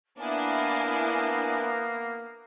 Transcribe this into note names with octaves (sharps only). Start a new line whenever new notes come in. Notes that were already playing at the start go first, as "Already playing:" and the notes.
A#3 B3 D4 E4 G#5